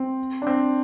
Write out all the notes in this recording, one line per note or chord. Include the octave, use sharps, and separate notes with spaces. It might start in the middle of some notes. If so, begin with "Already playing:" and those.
Already playing: C4
D4
C4